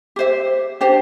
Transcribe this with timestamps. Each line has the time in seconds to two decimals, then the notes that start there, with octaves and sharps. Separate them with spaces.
0.16 G4 C5 E5
0.81 D4 G4 C5 G5